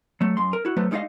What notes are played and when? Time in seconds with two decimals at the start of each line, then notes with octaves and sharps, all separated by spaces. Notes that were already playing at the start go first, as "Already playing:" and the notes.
0.21 F#3 A3
0.37 F#2 C6
0.53 A#4
0.65 E4 F#4
0.77 F#3 A3 B3 B4 C5
0.91 G3 G#3 D#4 C#5 D#5 F5